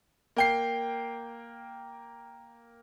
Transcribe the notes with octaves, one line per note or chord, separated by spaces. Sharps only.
A#3 G5 C7